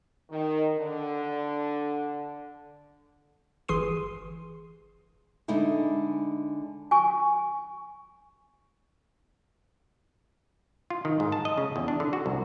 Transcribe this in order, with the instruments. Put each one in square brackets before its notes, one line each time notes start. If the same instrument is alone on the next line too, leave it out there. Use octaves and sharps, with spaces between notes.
[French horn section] D#3
D3
[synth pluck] G1 E3 G#4 C6 C7 D#7
[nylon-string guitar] D3 G#3 D#4 E4 G#4
[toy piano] G#5 C#6
[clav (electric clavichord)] F4
D#3
G#2
A5
D#5
C#3
E2
D4
D3
F#4
C2